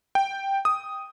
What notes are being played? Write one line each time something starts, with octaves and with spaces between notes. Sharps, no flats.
G5
D#6